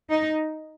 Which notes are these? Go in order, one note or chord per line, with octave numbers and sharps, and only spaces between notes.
D#4